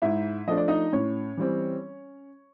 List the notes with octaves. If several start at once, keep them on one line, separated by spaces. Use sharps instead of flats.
G#2 E4 E5
F3 A3 D4 D#5
D5
D#4 D#5
A2 C#4 C#5
E3 G3 C4